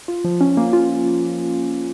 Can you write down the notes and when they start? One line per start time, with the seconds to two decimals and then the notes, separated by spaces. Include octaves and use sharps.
0.08 F4
0.24 F3
0.41 C#4
0.57 A#3
0.73 F4